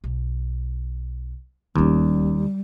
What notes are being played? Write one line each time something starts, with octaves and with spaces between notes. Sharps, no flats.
B1
D1 D#2 G3 C#4